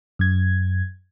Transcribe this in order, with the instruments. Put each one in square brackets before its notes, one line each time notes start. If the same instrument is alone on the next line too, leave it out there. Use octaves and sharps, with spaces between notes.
[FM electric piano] F#2 G#6